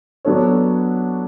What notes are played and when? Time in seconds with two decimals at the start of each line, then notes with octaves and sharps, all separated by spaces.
0.25 F#3 B3 D4 A4 C#5